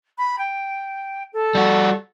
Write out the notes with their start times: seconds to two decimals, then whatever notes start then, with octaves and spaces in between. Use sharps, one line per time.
0.18 B5
0.39 G5
1.33 A4
1.55 G3 F#4